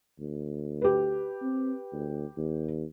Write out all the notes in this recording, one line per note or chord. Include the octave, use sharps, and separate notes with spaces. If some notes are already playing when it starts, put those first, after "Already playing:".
D2
G4 B4
C4
D2
D#2